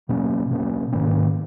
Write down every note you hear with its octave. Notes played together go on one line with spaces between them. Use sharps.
B2 F#3 A#3 C#4
B2 F#3 A#3 C#4
G#2 D#3 A#3 C#4